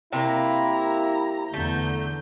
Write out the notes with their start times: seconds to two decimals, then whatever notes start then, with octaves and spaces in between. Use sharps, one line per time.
0.13 C3 A#3 E4 A#5
1.54 E2 D3 A3 G6